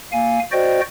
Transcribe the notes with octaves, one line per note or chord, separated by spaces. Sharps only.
A#3 F5 G#5
F#4 C5 D5 D#5 G5